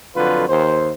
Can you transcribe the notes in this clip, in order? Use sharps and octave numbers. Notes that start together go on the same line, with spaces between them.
F2 D3 F#3 F4 B4
D#2 C5